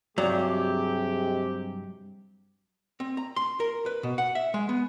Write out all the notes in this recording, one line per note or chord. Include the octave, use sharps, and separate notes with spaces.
G2 C3 F#3 G#3 G4
C4
A#5
C6
A#4
B4
B2
F#5
E5
G#3
B3